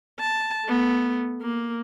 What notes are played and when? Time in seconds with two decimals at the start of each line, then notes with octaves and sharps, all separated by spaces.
0.20 A5
0.66 A3 B3
1.42 A#3